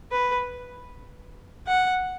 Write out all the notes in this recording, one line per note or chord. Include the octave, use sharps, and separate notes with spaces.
B4
F#5